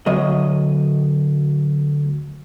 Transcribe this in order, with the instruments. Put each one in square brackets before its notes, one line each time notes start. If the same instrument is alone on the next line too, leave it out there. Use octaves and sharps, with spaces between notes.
[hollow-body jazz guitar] D2 F#3 D#5